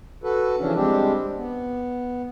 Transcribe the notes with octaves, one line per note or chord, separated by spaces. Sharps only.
F#4 A4 B4
C#3 E3 F3 C#4 D4
G3 G#3 C4 D4 G4
B3